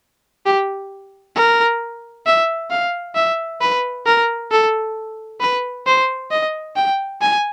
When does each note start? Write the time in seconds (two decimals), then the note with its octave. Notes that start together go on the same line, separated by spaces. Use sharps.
0.46 G4
1.36 A#4
2.26 E5
2.70 F5
3.15 E5
3.61 B4
4.06 A#4
4.51 A4
5.41 B4
5.86 C5
6.31 D#5
6.76 G5
7.21 G#5